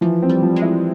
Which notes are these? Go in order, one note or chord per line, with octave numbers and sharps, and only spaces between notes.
E3 F3
C4
G3
F3
G#3
E4